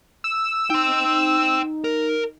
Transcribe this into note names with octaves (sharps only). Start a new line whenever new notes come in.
E6
D#4 G5 C6
A#4